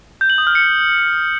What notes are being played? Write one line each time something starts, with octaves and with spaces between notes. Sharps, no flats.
G6
F#7
D#6
F6
C#7